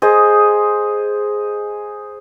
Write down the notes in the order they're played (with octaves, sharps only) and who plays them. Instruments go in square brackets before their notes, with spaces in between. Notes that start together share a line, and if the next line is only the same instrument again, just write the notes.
[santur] G#4 C5 D#5